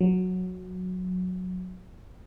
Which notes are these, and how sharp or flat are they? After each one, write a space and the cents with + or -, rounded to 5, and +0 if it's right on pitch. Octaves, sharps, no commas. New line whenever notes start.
F#3 -15